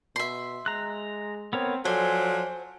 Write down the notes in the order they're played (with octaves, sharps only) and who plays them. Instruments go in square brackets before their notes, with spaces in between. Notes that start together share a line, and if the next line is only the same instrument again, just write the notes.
[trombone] B2 [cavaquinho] E5 C6
[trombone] G#3 [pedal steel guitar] A#5 F#6
[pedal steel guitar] B3 A#4 C#5 [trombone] C4
[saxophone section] F3 F#3 D5 [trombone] A4 [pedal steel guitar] C5 [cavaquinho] G#5